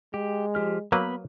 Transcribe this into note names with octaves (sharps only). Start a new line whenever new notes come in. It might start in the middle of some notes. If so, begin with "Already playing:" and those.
G#3 G4
F3 G4 F6
F#3 A#3 B3 B4 B5